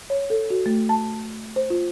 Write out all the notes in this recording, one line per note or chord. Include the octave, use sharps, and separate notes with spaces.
C#5
A4
F#4
A3
A5
C5
F4